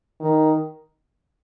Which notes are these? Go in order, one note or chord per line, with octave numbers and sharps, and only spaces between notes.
D#3